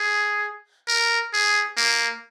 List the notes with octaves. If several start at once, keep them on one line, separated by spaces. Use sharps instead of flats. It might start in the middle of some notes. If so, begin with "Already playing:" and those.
Already playing: G#4
A#4
G#4
A#3